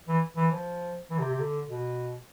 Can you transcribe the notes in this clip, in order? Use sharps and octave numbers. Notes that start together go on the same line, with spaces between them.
E3
E3
F3
E3
C3
C3
D3
B2